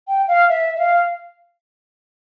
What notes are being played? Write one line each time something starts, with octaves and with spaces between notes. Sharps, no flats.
G5
F5
E5
E5
F5